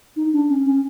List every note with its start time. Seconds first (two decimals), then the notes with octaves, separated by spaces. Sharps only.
0.16 D#4
0.33 D4
0.49 C#4
0.66 C#4